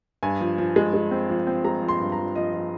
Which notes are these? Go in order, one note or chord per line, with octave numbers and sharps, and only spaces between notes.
G2 G#5
F3
F3
G#3
G#3
C4
F3
C4
G#3 A#5
F3
C6
G2
A#5
F3
F3 D#5
F3